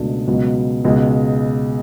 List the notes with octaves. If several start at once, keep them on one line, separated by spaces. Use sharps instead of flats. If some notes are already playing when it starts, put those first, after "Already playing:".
Already playing: C#2 B2 A3 D4 F#4
C#2 B2 F#3
C#2 B2 G#3